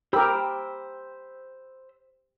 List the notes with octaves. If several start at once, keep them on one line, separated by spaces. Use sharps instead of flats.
G4 A#4 C5 B5 E6